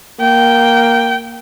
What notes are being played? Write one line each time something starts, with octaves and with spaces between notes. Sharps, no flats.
A#3 G5